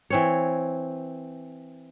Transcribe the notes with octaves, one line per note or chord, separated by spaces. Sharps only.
E3 C4 C#5